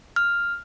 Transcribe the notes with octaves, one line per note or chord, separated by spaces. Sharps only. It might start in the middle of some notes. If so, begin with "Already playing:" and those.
F6